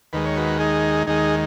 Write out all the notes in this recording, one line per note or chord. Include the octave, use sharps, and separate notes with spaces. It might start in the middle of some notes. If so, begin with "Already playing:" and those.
D#2 D#3 G#3 B4
C#5
F#4 B4
D#4 G#4
D#2 D#3 G#3 D#4 G#4